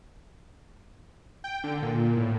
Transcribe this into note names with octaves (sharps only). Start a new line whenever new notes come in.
G5
D3
A#2
A2